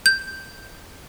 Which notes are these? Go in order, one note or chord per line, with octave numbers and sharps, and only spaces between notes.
G6